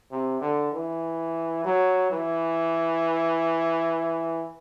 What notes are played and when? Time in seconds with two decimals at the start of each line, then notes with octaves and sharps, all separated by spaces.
0.11 C3
0.41 D3
0.73 E3
1.64 F#3
2.10 E3